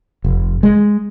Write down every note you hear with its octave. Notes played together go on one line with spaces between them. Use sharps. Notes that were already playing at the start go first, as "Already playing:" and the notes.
F1
G#3